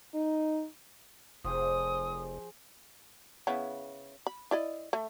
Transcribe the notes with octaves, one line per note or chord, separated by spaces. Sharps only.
D#4
F1 F3 G4 G#4 D#6
C#3 B3 E4
B5
E4 D5 D#5
A3